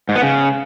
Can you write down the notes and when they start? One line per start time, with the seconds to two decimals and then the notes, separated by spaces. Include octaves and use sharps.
0.09 G#2
0.16 B3
0.22 C#3